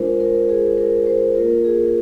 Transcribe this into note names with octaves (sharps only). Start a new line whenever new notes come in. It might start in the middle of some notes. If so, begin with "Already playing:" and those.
Already playing: G#3 D4 F4 A#4 C5
A#4
G#4
A#4
C5
A#3 F4 A#4
G#4